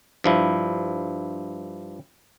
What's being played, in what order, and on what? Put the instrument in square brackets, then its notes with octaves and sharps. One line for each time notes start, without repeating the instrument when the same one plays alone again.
[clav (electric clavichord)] G2 F3 E4